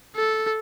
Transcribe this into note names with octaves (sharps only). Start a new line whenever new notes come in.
A4